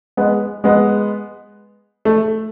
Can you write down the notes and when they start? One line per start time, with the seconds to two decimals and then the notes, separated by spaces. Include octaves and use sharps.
0.17 G#3 B3
0.64 G#3 B3
2.05 A3